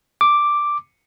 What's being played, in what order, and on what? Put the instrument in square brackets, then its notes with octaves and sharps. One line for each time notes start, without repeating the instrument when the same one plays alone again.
[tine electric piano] D6